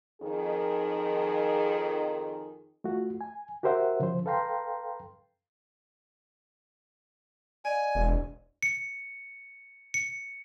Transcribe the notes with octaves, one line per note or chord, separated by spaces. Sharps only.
F2 D#3 G#4
A3 F4 F#4
G#5
F#4 G4 A#4 C5 E5 F#5
C#3 F3 C5
A4 B4 F5 G5 A#5 C6
D5 D#5 F5 G#5
E1
C#7
C#7